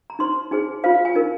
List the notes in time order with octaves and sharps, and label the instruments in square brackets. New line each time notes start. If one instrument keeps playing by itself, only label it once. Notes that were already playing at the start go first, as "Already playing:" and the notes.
[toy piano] A#5
D#4 C5 C6
D#4 G#4 C5 G#5
F4 C5 F5
F5
G#5
D#4 A#4